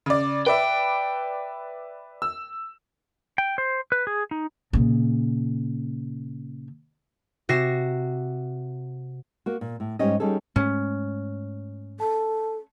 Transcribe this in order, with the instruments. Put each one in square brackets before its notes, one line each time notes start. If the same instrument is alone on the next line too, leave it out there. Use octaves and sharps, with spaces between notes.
[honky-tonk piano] C#3 D5
[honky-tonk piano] B4 D5 E5 [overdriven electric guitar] G5
[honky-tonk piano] E6
[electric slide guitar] G5
C5
B4
G#4
D#4
[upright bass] A#2 C#3
[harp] C3 F#4 A#6 C7 E7
[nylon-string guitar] A#3 F#4
A#2
A2
G#2 G3 C#4 G4 D#5
G3 C#4 D#4 G#4 A4
[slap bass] G#2 G#3 A3 [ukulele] C#4
[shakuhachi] A4 [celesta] A5